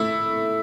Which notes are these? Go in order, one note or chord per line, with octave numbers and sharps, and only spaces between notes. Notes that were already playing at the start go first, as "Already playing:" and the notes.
Already playing: A3 E4